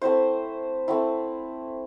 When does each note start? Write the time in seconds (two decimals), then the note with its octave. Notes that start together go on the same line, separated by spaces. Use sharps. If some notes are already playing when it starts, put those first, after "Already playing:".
0.01 A3 C4 E4 C5
0.88 A3 C4 E4